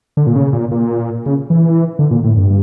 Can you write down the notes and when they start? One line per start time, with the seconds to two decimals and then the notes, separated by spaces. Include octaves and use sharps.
0.17 D3
0.27 A#2
0.36 C#3
0.53 A#2
0.71 A#2
1.26 C#3
1.50 E3
1.99 D3
2.11 A#2
2.24 A2
2.36 G2